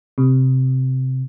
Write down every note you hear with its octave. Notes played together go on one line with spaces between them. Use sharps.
C3